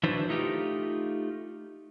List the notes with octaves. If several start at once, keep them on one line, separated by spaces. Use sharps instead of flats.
E3 F#3 D4 E4 B4 C5
A3 D#4 F4 G4